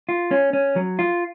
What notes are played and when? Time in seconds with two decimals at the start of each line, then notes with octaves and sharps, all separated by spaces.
0.09 F4
0.31 C#4
0.53 C#4
0.76 F#3
0.99 F4